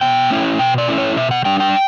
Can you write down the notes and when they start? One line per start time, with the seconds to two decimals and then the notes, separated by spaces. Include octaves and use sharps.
0.01 B2 G5
0.30 A3 C#4 E4
0.59 B2 G5
0.78 D5
0.88 A3 C#4 E4
0.98 C#5
1.17 B2 E5
1.31 F#5
1.45 G3 D4 G5
1.60 G5